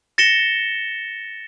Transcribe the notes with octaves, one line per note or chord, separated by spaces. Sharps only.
A6 A#6 C#7 E7 G7